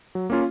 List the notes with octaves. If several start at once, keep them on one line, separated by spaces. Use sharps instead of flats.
F#3
A#3 C#4 F4